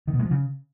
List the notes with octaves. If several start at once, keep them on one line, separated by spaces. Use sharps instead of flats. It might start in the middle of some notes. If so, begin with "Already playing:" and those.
D#3
B2
G#3
F3
C#3